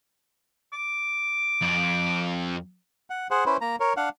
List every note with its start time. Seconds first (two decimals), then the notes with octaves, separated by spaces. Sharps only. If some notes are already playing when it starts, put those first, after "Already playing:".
0.73 D6
1.62 F2
3.10 F#5
3.31 G#4 C5 F#5
3.46 C#4 E4 B4 C5
3.61 A#3 A#5
3.80 A#4 C#5
3.97 D4 F5 F#5